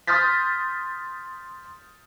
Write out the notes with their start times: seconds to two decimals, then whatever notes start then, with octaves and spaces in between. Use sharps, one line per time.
0.07 C6 D#6 F6 G6 A6 B6